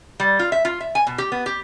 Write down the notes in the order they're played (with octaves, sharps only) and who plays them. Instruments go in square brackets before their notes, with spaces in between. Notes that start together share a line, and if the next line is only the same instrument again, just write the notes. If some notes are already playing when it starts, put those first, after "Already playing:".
[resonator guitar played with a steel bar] G3
F4
E5
F4
E5
G#5
B2
G4
B3
G4